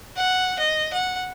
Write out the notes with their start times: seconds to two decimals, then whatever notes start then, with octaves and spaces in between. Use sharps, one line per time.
0.16 F#5
0.59 D#5
0.93 F#5